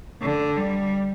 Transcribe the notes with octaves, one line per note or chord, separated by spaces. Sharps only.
D3
G3